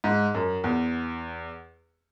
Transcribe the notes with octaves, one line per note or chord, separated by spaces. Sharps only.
G#2
F#2
E2